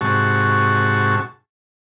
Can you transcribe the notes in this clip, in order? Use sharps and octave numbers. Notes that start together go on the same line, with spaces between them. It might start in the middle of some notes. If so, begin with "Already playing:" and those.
G#2 C3 F#4 A5 C#6